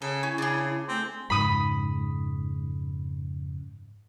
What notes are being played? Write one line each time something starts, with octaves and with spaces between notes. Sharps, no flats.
C#3 A4
C#4 E4
C#3 D4 G#4
A3 C4
F2 G#2 C#3 G#3 B5 D#6